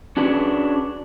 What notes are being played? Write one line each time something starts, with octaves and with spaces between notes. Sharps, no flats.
C#4 D4 F#4 G#4 B4